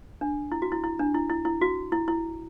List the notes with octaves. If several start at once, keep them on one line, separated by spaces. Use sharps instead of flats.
D4
E4
F#4
E4
E4
D4
E4
E4
E4
F#4
E4
E4